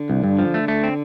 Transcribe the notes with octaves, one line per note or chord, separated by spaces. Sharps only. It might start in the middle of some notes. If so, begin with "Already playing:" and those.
Already playing: D3
C2
G2
F3
A3
A3
C4